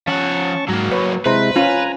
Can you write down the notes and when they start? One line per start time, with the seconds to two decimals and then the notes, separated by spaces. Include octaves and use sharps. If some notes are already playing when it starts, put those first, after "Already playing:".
0.07 F3 C#4 F#5 A5 C#6
0.69 G#2 F#3 A#3
0.92 B4 C#5
1.26 C3 G#3 E4 B4 C5 A#5
1.56 C#4 F4 G#5 A#5